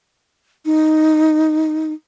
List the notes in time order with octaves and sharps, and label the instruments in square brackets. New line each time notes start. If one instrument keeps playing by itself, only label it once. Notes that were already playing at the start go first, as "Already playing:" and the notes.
[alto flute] D#4